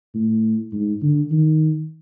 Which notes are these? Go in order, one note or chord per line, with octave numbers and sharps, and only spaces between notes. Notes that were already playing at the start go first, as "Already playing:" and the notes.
A2
G#2
D3
D#3